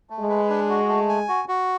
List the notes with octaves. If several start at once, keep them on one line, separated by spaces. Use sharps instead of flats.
A3
G#3
B4
D4
F#4
A3
G#5
F#4
F#4